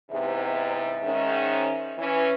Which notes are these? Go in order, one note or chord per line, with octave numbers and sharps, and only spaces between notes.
E2 G#2 C3 E5
G#2 D#3 C#4
E3 C#4